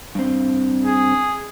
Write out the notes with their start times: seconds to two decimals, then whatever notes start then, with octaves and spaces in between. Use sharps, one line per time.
0.15 G2 C4
0.85 G#4